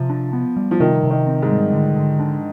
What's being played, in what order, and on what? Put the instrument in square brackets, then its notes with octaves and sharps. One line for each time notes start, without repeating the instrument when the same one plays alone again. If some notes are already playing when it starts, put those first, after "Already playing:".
Already playing: [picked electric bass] C3 [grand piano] F3
[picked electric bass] D4
B3
G3
[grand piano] F3
[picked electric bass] C3 [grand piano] D#3
[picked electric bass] C3
[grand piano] D#3
[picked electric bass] C4
[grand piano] G#2
[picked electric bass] G3
D3
D3
D4